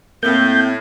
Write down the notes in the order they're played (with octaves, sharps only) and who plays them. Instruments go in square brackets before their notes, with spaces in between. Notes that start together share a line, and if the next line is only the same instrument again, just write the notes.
[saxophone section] A2 [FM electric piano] A#3 [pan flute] C4 [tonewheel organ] G6